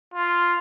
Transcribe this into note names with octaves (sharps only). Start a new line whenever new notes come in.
F4